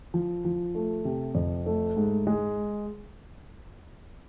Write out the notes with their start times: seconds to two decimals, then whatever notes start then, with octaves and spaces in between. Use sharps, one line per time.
0.14 F3
0.45 F3
0.75 A3
1.05 C3
1.35 F2
1.66 A3
1.97 G#2
2.27 G#3